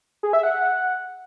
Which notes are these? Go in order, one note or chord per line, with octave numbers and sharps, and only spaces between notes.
G#4
E5
F#5